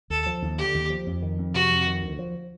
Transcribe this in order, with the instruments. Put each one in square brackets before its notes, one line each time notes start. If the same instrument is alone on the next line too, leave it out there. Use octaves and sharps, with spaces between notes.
[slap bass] D#2 [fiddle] A4
[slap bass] F3
D#2
[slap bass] D3 [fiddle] G4
[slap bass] D#2
F3
F2
D#3
F2
[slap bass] C3 [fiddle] F#4
[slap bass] F2
D#3
D2
F3